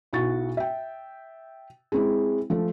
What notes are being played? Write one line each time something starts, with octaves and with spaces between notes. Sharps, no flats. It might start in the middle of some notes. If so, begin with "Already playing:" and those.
B1 E4 F#4 C#6 A6
E5 G5
G#3 C4 E4
F3 A3